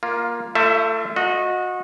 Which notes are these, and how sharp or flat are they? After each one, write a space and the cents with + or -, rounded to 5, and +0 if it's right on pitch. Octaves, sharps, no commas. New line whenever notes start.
A#3 +15 F4 +0
A3 +25 F4 -20 E5 +0
F#4 -25 D#5 +0